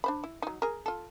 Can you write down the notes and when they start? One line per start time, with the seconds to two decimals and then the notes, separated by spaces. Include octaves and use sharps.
0.04 D4 C5 B5
0.24 E4
0.42 F#3 D#4
0.62 G#4 A#4
0.86 F4 A4